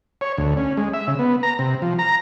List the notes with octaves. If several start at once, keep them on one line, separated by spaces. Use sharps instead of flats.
C#5
D2
C#4
G#3
E5
C#3
B3
A#5
C3
F3
A#5